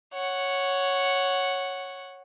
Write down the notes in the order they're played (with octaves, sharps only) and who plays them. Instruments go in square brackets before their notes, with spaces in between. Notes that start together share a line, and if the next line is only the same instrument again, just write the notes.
[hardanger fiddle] C#5 F#5